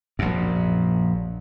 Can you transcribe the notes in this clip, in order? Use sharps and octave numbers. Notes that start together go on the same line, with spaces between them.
A#1 F#2